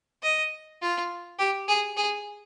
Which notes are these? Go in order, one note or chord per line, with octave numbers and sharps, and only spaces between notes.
D#5
F4
G4
G#4
G#4